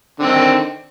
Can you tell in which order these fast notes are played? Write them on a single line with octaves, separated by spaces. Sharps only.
D3 C4 D#3